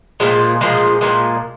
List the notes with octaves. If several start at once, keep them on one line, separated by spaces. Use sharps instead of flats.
A#2 F3 G#3
A#2 F3 G#3
A#2 F3 G#3